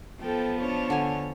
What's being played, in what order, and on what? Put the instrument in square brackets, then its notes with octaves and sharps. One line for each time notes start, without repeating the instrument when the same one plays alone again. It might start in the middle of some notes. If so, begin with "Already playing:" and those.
[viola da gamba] F3 B3 [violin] A4 G5
[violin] D4 C#5
[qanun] D3 G#5